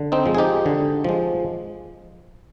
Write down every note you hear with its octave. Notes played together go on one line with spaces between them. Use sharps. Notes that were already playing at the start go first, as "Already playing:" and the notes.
Already playing: D3
C4 D#4
F3 G#3
G#4
D#4 G4
D3
F3 G#3